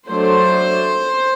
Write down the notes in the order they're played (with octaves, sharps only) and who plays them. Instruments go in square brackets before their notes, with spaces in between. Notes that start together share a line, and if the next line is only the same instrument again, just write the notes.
[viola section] F#3 A3 D4 C5